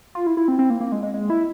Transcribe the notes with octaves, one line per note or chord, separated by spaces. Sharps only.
F4
E4
E4
C4
C4
A#3
A#3
G#3
G#3
G#3
E4